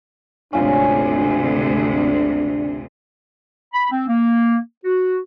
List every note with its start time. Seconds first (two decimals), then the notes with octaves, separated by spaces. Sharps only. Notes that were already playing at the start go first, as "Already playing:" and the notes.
0.53 G#1 D2 C3 C#4 D4 F4
3.74 B5
3.91 C4
4.08 A#3
4.84 F#4